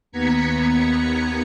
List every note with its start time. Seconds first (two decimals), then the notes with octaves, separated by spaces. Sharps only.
0.11 D#2 B3 A#5 G#6 B6 C#7